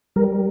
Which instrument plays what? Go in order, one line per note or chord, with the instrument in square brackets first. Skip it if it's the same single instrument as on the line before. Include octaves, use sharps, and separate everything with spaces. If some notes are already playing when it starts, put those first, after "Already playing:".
[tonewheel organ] G3 A#4